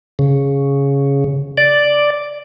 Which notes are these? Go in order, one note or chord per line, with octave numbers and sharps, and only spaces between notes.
C#3
D5